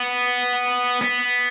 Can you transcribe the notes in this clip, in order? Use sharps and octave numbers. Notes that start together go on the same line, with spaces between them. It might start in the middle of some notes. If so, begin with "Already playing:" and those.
Already playing: B3
B3